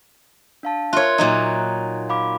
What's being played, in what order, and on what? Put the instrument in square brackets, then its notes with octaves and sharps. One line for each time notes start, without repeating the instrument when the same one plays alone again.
[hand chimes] D4 F5 A5
[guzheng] F4 C#5 [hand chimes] A#4 E5 F#6
[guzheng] A#2 F#3 D#4
[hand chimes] F5 B5 D6